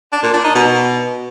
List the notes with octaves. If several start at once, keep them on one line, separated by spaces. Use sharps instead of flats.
D4
A#2
D4
D#4
B2